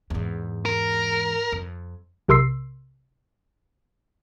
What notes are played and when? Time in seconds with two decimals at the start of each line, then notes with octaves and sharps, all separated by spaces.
0.10 E2 G#2
0.65 A#4
1.52 F2
2.28 B1 C3 A#4 C6 E6 C7